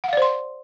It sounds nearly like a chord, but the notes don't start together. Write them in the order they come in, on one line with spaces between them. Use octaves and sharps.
F#5 F5 D5 C5 C6